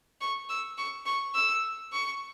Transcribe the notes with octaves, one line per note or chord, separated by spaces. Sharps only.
C#6
E6
C#6
C#6
E6
C#6